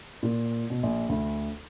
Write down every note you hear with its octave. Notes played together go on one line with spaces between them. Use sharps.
A#2
B2
A#1
D2